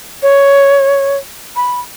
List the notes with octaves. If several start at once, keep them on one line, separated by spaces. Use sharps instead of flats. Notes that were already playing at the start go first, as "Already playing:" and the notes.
C#5
B5